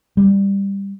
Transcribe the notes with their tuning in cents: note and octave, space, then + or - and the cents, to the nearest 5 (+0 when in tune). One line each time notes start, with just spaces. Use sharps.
G3 +15